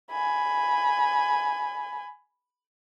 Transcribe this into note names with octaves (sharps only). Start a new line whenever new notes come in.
G#5 B5